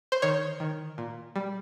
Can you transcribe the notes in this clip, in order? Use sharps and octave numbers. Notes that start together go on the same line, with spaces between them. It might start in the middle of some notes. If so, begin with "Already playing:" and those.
C5
D#3 C#5
D#3
A#2
G3